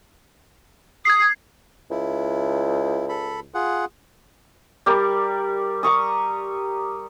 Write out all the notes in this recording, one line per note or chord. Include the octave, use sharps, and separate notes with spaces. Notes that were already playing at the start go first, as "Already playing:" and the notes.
D#6 G#6 C7
C#2 E4
A4 B5
F4 G#4 F#5
G3 G4 A#4
A#5 C#6 D#6